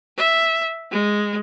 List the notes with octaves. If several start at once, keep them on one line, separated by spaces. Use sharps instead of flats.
E5
G#3